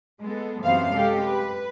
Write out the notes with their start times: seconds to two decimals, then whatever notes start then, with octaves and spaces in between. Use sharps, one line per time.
0.22 G#3 B3 A4
0.63 F#2 C3 E3 B3 C5 F5
0.95 G#3 G4 A4
1.25 B4